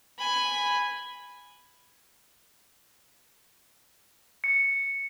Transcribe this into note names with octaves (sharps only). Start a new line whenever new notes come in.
G#5 B5
C#7